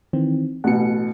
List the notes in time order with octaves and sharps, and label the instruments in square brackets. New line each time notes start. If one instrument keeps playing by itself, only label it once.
[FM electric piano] D#3 E3 C4
[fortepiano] A1 B2 [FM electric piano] F#5 C#7